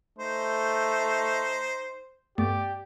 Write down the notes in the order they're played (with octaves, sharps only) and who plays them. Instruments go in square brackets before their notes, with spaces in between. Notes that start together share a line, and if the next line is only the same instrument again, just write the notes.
[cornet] A3 [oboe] D#4 [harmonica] C5
[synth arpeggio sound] G2 A3 B3 [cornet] G4 [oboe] D5